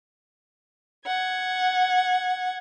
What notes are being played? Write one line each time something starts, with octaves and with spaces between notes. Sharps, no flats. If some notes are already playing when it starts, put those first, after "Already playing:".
F#5 G#6